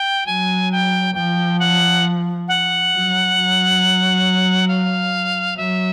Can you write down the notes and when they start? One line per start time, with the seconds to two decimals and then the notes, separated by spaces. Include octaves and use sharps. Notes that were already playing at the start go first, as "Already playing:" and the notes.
Already playing: G5
0.27 F#3 G#5
0.72 G5
1.15 F3 G5
1.60 F#5
2.48 F#5
2.91 F#3
3.36 F#3
4.68 F5
5.57 F#3 E5